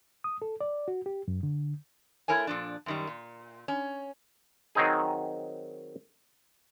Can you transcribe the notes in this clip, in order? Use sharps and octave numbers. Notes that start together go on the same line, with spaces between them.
D#6
A4
D5
F#4
G4
F#2
D3
A3 E4 A#4 C#5 G#5
A#2 F3 D4
F#2 D#3 G3
A#2
C#4
D#3 F#3 C4 D#4 G#4